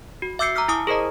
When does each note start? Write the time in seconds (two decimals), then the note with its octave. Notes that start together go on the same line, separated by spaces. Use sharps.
0.22 F#4
0.39 E5 D6 E6 G6 C7 C#7
0.55 A#5 D6 E6 F6 B6
0.68 E4 G#5 A5 D6 D#6
0.87 G#4 A#4 C5 D#5 A#5